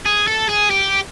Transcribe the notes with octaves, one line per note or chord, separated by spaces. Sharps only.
G#4
A4
G#4
G4